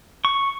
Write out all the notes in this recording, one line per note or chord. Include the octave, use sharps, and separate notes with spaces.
C#6